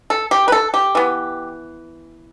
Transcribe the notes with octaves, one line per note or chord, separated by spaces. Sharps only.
A4
G4
B4
A4
G4
E3 B3